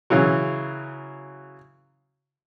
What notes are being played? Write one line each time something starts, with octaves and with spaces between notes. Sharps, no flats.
C#3 E3 F#3